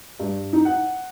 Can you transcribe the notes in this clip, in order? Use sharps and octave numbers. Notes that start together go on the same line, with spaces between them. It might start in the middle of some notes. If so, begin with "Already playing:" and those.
G2
D#4
F#5